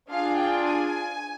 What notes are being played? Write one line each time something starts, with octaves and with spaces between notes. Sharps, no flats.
D4 F4 G#4 F5
G5
G#5